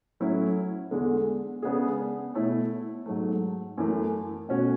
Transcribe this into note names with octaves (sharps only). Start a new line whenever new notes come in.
A2 F#3 C#4 E4
E2 D3 G#3
C#3 G#3 B3 D4 G#4
B2 A3 E4 A4 C#5
G#2 F#3 A3
F#2 E3 A3
B2 A3 C#4 F#4